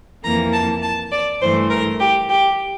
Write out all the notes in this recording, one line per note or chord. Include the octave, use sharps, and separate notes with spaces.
F2 E3 A#3 A#5
A5
A5
D5
G2 E3 A3 C5
A#4
G4
G4